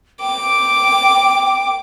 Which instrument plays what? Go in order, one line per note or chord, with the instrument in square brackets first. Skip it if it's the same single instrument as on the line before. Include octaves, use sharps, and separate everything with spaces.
[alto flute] G5 [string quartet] D6